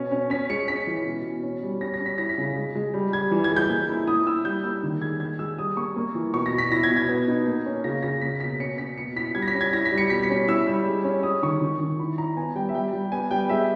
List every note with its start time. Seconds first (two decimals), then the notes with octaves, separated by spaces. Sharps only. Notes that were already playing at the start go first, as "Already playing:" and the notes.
Already playing: B2 C#4
0.11 C#4
0.30 C#4 B6
0.50 G#3 C#7
0.68 C#4 B6
0.87 E3
1.05 B2
1.25 B2
1.43 C#4
1.63 G3
1.81 C#4 A#6
1.94 A#6
2.00 C#4
2.06 B6
2.18 E4 A#6
2.29 B6
2.38 C#3
2.56 G#3
2.75 G#3
2.94 G3
3.13 G3 G#6
3.31 E3
3.44 G#6
3.51 G#3
3.56 G6
3.69 A#3
3.89 E4
4.07 E4 D#6
4.26 E4 E6
4.45 G3 G6
4.64 A#3 E6
4.83 D#3
5.02 G#3 G#6
5.20 G#3 G#6
5.39 G#3 E6
5.58 G3 D#6
5.77 A#3 C#6
5.96 A#3
6.15 E3
6.34 B2 C#6
6.46 A#6
6.53 B2
6.58 B6
6.71 E4 A#6
6.84 G#6
6.90 B2
6.96 G#6
7.09 B3
7.28 D#4
7.47 A#3
7.66 C#4
7.84 C#3 A#6
8.03 C#3 A#6
8.21 A#3 B6
8.40 B2 B6
8.60 C#4 C#7
8.78 C#4 B6
8.97 B2 C#7
9.16 E4 B6
9.35 G3 G#6
9.42 A#6
9.48 B6
9.54 C#4
9.61 G#6
9.73 E4 A#6
9.85 B6
9.92 G3
9.98 C#7
10.10 B2 B6
10.23 B6
10.30 C#4
10.48 E4 E6
10.67 G3
10.86 G#3
11.04 C#4
11.23 G#3 D#6
11.43 D#3 C#6
11.62 D#3
11.81 D#3
11.99 E4 B5
12.18 E4 A#5
12.36 B3 G#5
12.55 G3 G5
12.69 E5
12.74 G3 G5
12.93 G3
13.12 B3 G#5
13.31 G3 G5
13.49 G#3 E5